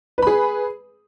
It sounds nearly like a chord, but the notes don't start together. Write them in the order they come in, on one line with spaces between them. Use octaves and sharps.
B4 B5 G#4